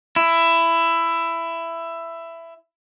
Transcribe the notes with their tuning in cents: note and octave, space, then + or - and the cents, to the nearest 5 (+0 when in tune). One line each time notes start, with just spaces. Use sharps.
E4 +15